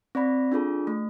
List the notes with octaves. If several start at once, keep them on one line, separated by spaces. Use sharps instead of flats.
C4 D5 B5 A#6
D4 F4 G#4 A4
A3